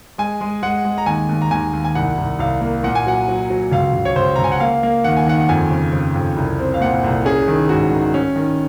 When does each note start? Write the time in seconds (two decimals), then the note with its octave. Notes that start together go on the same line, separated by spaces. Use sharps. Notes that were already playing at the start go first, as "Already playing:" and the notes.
0.18 G#3 G#5
0.41 G#3
0.63 G#3 F#5
0.85 G#3
0.98 A#5
1.06 D#2 G#5
1.29 D#2
1.42 A#5
1.51 D#2 G#5
1.73 D#2
1.85 G#5
1.95 C2 F#5
2.17 C2
2.39 C2 F5
2.61 A#3
2.84 A#2 F#5
2.95 G#5
3.06 F#3 F#5
3.28 F#3
3.50 F#3
3.72 C#2 F5
3.94 C#2
4.05 C#5
4.16 C#2 C5
4.36 C#2 A#5
4.44 G#5
4.52 F#5
4.60 A#3 F5
4.83 A#3
5.04 D#2 F#5
5.17 G#5
5.26 D#3 F#5
5.40 F#5
5.49 F2 G#5
5.71 C#3
5.93 C#3
6.16 F2
6.37 C2
6.59 C4
6.74 F5
6.81 A#2 F#5
7.04 C2
7.25 C#4 G#4
7.48 D#3
7.69 G#2 F#4
7.91 D#3
8.14 C#4
8.36 D#3